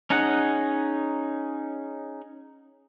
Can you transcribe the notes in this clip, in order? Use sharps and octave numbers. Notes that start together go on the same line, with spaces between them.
C#4 D#4 G#4 F#5